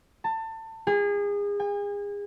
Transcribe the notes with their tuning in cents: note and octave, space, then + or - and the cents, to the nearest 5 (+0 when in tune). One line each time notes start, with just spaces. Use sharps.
A5 +25
G#4 -30
G#5 -40